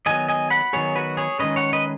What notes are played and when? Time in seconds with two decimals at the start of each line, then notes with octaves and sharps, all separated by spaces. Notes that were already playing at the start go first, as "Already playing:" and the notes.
0.06 D#3 F#3 B3 D#5 G#5
0.28 D#5 G#5
0.50 F#5 B5
0.73 D#3 F#3 B3 G#4 C#5
0.96 F#4 B4
1.17 G#4 C#5
1.39 D#3 G#3 C#4 B4 D#5
1.56 C#5 F#5
1.73 B4 D#5